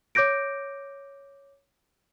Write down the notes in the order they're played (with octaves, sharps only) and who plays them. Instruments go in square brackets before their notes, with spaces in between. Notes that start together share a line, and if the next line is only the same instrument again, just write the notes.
[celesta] C#5 D6 G6 A#6 D7